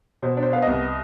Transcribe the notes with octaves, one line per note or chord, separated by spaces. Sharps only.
B2 C5
D4
C5
B3 F5
C2 D#5